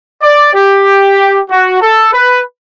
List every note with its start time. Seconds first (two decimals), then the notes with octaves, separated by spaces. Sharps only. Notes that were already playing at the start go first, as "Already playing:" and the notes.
0.22 D5
0.54 G4
1.50 F#4
1.81 A4
2.13 B4